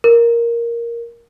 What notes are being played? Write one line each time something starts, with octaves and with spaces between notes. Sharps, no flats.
A#4